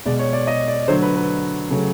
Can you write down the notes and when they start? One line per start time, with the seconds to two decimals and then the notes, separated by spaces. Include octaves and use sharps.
0.05 B2 G#3 D5
0.19 C#5
0.33 D5
0.47 D#5
0.68 D5
0.88 D3 F#3 A3 C5
1.02 B4
1.17 B4
1.70 C#3 F#3 A3